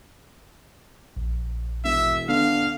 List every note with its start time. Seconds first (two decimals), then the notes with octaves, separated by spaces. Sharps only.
1.17 A#1
1.84 E1 E5
2.29 D3 B3 F5